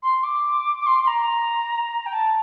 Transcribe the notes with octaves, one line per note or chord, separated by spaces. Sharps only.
C6
D6
D6
C6
C6
A#5
G5
A5